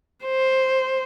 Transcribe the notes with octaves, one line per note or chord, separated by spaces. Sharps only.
C5